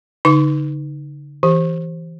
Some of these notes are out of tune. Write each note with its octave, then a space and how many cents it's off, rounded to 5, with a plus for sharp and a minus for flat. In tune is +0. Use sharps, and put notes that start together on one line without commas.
D3 -40 D#4 +0 C#6 +45
E3 +0 G4 -5